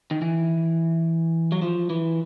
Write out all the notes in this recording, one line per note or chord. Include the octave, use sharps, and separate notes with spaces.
D#3
E3
F#3
F3
E3